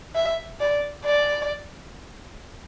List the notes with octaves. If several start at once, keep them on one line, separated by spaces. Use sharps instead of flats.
E5
D5
D5